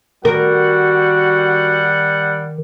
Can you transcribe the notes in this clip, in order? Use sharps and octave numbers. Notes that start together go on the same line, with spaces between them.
D#3 G3 F#4 A#4 F#5